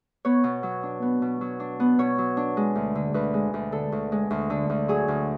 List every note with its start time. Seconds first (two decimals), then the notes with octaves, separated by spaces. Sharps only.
0.25 B3 C#5
0.44 B2
0.63 F#3
0.83 D4
1.02 B3
1.22 B2
1.41 F#3
1.60 D4
1.80 B3
1.99 B2 C#5
2.18 F#3
2.37 D4
2.57 G#3
2.75 D2
2.95 D3
3.14 D2 B4
3.34 G#3
3.54 D2
3.72 D3 A4
3.92 D2
4.12 G#3
4.31 D2
4.50 D3
4.70 D2
4.88 F#3 G#4
5.08 D2